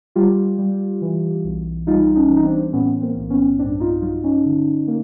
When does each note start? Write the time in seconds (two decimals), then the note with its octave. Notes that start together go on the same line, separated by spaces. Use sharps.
0.16 G3 F4 G4
0.58 G3
1.02 E3
1.44 B1
1.87 G3 D#4 F4
2.16 C#4 D#4
2.30 E3
2.36 D#4
2.44 C4 D4
2.73 A2 B3 C#4
3.01 A#3 C4
3.15 B1
3.30 B3 C#4
3.59 G2 C4 D4
3.80 D#4 F4
4.02 F#3 D#4 F4
4.24 C#4 D#4
4.45 D3
4.88 A#3